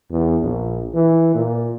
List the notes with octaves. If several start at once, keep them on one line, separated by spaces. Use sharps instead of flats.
E2
A#1
E3
A#2